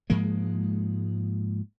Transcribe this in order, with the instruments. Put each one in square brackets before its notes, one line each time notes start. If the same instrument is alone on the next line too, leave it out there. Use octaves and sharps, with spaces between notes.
[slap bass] G#2 F3 G#3 A#3